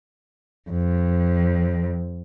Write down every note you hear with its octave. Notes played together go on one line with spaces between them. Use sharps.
F2